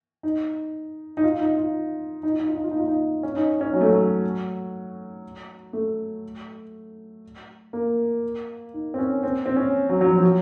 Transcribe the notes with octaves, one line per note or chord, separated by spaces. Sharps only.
D#4
D#4
F4
D#4
F4
D#4
F4
D#4
F4
D#4
F4
D#4
F4
D#4
C#4
D#4
C#4
F#3
A3
F#3
A3
A#3
D#4
C4
C#4
C4
C4
C#4
F#3
F#3
F3
F3
F#3